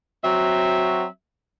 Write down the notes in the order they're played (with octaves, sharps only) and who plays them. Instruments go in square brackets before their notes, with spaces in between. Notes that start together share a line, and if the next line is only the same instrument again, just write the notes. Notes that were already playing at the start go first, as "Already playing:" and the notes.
[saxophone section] F#3 C4 F#4 E5